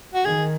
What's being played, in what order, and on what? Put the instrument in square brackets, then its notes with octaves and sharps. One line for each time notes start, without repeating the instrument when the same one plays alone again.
[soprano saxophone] F#4
[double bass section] D#3 [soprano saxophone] G#4